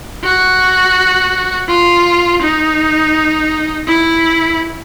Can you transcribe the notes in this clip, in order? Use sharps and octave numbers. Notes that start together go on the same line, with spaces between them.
F#4
F4
D#4
E4